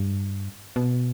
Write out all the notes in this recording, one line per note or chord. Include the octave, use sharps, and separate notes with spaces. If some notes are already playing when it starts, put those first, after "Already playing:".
Already playing: G2
B2